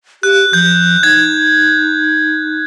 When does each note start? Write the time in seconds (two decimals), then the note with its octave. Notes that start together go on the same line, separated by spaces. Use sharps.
0.23 G4 F#6
0.53 F3 G6
1.03 D#4 G#6